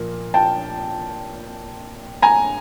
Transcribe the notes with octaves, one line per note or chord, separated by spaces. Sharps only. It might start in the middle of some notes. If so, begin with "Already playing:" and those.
Already playing: A#2 F3 A#3
G5 A5
G#5 A#5